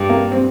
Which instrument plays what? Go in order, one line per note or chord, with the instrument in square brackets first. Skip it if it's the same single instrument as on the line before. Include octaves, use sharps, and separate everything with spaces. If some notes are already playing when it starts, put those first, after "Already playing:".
Already playing: [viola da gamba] G2
[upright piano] A#3
C4